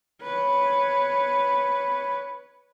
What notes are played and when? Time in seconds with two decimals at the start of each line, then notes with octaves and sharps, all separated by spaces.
0.21 B4 C#5